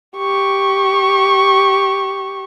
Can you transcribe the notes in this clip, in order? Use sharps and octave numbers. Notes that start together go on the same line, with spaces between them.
G4 C#6